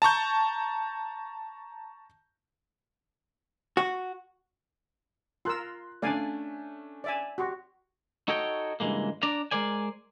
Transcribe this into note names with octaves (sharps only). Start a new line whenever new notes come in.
A5 A#5 C#6 G6
F#4
F4 A#4 C6 E6 F#6
A3 C#4 D4 D5 F5 G#5
D5 E5 G#5
F#4 G4 C6 C#6
D#4 F#4 A4 C#5 D#5 G5
C#2 G2 A#2 E3 G#3 A#3
D4 D5 A#5
G#3 A#4 C5 D5 G#5